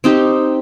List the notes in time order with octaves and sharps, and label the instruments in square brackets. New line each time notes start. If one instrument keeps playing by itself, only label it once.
[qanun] C4 D#4 G4